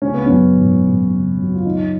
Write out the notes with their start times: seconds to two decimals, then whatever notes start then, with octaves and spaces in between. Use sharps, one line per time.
0.02 C#3 C#4
0.14 B3
0.26 F#2 C#4
0.56 G#1
0.83 G#1
1.11 C#3
1.38 F#2 F#4
1.55 F4
1.66 D#3 D#4